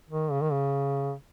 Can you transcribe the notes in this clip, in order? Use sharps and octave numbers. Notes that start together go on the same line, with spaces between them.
D#3
C#3
D#3
C#3